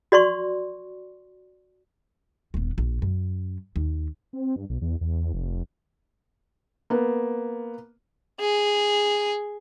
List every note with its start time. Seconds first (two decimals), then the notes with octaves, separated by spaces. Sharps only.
0.12 F#4 D5 C6 C#6
2.54 D#1 B3
2.78 A#1
3.02 F#2
3.76 D#2
4.33 C4
4.56 G2
4.70 B1
4.81 E2
5.01 E2
5.34 F1
6.90 A#3 B3
8.40 G#4